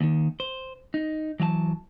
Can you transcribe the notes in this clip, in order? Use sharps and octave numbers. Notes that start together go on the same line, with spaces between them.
D#2 D#3
C5
D#4
E3 F#3 F5 A5